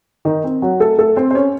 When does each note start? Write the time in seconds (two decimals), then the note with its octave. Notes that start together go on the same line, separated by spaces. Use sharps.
0.25 D#3 D#4
0.44 C4
0.62 F#3 F#4
0.80 A3 A4
0.98 A3 A4
1.16 C4 C5
1.31 C5
1.35 C#4 C#5